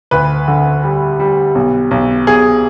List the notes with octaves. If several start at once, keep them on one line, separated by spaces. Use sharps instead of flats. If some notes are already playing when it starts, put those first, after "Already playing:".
D2 B4
D3
G3
G3
B1
B1
B1 G#4